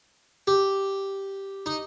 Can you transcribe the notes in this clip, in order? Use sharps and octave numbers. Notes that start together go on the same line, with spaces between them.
G4
D#4